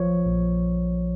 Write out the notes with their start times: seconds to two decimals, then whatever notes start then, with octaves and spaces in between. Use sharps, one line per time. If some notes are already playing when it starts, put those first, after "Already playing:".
Already playing: A#1 F3 C#5
0.26 A#1